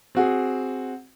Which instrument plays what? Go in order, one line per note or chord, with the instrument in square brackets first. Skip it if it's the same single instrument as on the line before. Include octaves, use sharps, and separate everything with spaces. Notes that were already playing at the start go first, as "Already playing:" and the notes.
[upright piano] C4 F#4 G#4